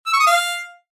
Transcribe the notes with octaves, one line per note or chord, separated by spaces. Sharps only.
E6
C#6
D#6
F5